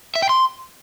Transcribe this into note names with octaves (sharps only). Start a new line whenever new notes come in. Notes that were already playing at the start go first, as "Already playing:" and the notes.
E5
G5
C6